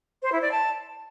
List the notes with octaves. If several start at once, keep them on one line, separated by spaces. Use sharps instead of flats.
C5
E4
D5
A5